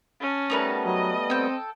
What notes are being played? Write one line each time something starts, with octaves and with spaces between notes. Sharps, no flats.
C#4 A5
G3 A3 B3 D#4 A#4 B4
F#3 D#5
C4 A4 G5